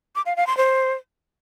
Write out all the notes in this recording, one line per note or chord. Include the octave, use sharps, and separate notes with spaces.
D6
F5
F5
C6
C5